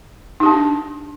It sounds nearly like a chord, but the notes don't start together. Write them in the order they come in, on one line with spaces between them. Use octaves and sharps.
D#4 G4 D4